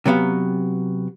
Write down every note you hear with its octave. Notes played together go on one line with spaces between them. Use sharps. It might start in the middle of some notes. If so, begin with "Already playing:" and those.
C3 F#3 B3 F5